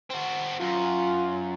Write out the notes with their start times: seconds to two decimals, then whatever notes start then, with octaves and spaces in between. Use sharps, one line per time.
0.10 C4 F#4
0.60 F#2 F4